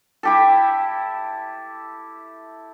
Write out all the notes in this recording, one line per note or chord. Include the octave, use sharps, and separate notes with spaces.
E4 G4 A4